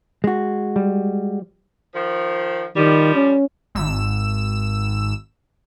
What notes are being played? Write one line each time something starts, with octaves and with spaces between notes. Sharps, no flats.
G#3 F#4
G3
D#3 F3
D#3 F3 G3
C#4
G#1 E6 E7